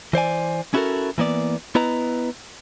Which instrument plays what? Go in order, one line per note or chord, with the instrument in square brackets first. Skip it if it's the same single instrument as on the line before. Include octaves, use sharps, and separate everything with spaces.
[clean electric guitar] E3 C5 D5 G#5
C#4 E4 F#4 G4 A4 A#4
E3 A#3 B3 D5
B3 E4 B4 D#5 A#5